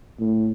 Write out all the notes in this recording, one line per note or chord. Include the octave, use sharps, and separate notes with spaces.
A2